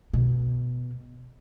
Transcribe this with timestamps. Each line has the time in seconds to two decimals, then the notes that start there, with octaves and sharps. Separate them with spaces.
0.14 B2